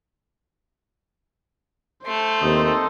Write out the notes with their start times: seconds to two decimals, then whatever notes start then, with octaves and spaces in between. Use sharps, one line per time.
2.06 A3 C5 C6
2.42 D#2 C4 D#4 A4